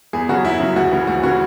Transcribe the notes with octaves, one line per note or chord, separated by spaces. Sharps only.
E2 G#4
C#3 F#3 F#4
E2 E4
C#3 F#3
D2 F#4
C#3 E3
D2 F#4
C#3 E3 F#4